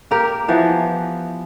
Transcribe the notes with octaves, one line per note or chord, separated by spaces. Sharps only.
A#3 G4 A#4
E3 F3 B3